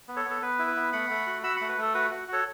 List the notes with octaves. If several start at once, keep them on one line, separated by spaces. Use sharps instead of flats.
B3
A4 C#5
B3
A4
B3 B4
E4
B4
B3
A3 F#5 B5
A3
F#4
F#4 B5 E6
A3 F#5 B5
B4
A3 A4
F#4 B4
F#4
F#4 A4 C#5